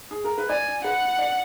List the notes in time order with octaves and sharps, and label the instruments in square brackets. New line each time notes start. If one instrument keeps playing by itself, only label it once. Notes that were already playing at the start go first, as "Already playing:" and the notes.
[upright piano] G#4
A#4
B4
[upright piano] D5 [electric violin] G#5
[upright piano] B4 [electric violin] F#5
[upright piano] D5